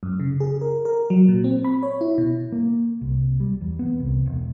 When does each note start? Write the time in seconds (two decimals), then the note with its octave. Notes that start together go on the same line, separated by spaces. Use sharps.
0.03 F#2
0.20 C#3
0.40 G#4
0.61 A#4
0.85 A#4
1.10 F#3
1.28 A#2
1.44 C4
1.65 B5
1.83 C#5
2.01 E4
2.18 B2
2.52 A#3
3.01 C2
3.40 G3
3.61 E2
3.79 B3
4.00 C2
4.26 E1